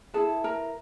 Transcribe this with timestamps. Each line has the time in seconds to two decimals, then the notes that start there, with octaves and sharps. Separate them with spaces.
0.14 E4 G#4 A4 B4 A5
0.44 A#4 A#5